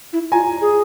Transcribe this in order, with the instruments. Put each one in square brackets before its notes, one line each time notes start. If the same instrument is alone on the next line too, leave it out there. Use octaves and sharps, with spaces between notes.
[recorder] E4
[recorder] F4 [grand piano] G#5 A#5
[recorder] G#4